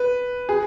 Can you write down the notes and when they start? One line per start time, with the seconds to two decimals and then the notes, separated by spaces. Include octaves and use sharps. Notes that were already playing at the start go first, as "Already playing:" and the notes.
Already playing: B4
0.49 G#4